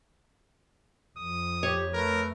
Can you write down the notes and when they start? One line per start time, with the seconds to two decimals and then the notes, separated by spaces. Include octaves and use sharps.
1.18 F2 F3 D#6
1.63 G4 C#5
1.94 A3 A#4 B4